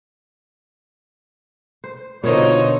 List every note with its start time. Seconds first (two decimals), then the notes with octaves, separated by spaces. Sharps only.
1.84 C5
2.24 B2 D3 D#4 F4 A#4 C5 C#5